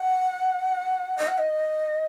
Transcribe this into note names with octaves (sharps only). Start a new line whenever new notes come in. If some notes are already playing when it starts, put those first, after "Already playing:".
Already playing: F#5
D#5
F#5
D#5